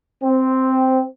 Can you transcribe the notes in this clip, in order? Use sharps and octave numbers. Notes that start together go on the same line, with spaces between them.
C4